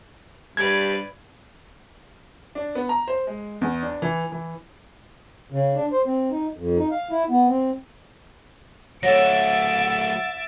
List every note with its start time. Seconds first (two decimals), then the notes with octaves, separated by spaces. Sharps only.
0.57 G2 B4 D5 G#6
2.55 D4
2.75 B3
2.89 A#5
3.08 C5
3.27 G#3
3.61 E2
3.83 D4
4.02 E3
4.32 E3
5.52 C#3
5.75 D4
5.92 C5
6.06 C4
6.31 D#4
6.56 F2
6.78 D#4
6.91 F5
7.11 E4
7.29 B3
7.48 C4
9.03 F#3 A3 C#5 E5 F#5 A6 A#6 D7